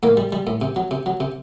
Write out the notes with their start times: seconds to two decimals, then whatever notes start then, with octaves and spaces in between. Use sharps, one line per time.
0.03 A2 A#3
0.17 G3
0.32 G3
0.47 A2
0.61 C3
0.76 F#3
0.91 C3
1.06 F#3
1.20 C3